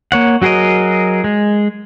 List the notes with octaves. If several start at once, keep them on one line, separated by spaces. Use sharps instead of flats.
A#3 C#5 F#5
F#3 F#4 G#4 A#4 D#5
G#3